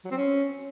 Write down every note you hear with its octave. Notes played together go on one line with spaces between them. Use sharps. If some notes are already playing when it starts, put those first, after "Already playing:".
F#3
C4
C#4